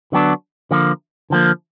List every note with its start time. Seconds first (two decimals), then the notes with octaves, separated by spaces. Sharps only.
0.12 D3 F#3 B3 D4
0.71 D3 F3 A#3
1.30 D3 F3 A#3